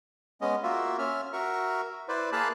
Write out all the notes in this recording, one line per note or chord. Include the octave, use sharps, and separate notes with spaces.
G#3 B3 C#4 D#5
A#3 F4 F#4 E5
C#4 E5 F6
F#4 A#4 E5 C#6
E4 B4 C5 D5
A#3 G#4 F5 A5 B5 F#6